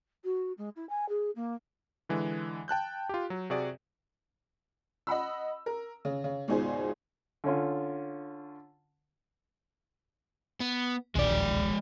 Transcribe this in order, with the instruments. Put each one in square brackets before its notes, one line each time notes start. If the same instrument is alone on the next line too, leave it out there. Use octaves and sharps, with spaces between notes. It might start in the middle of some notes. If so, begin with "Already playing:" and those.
[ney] F#4
G#3
E4
G#5
G#4
A#3
[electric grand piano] D3 E3 G#3
G5 A5 F#6 G6
F4 G4
F#3
C3 F#4 G#4 D5
[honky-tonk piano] D#5 F#5 B5 E6
A#4
C#3
C#3
G#1 C#2 B2 D#4 G#4 C5
[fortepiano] D3 C#4 F4
[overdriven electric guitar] B3
[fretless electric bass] D1 A#1 D#2 [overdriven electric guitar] G#3 D5